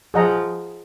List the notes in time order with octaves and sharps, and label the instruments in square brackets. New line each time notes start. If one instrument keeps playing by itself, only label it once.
[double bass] F3 [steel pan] G#4 D#5 F#5 A#5